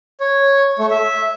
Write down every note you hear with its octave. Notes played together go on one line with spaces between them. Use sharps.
C#5
A3
E5